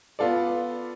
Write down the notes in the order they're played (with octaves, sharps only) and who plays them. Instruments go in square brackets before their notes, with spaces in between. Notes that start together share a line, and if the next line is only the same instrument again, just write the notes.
[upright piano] B3 F4 A4 D5